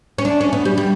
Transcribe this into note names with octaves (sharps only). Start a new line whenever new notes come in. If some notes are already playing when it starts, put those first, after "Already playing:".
C#4
D4
C#4
B3
G3
G3